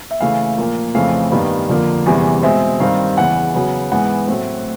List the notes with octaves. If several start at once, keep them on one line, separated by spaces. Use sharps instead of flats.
E5
C#3 E3 A3 F5
A#2 F3 A#3
F2 C#3 E3 A3 C4 F5
G2 D#3 G3 B3
F2 D3 F3 A#3
E2 C3 E3 G3 A#3
B2 G#3 C4 E5
G2 D#3 G3 C4 F5
E2 C#3 E3 F#5
C#3 F#3 B3
G#2 E3 G#3 B3 F#5
A2 F#3 A3 C4